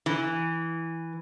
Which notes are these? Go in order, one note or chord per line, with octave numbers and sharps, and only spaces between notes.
E3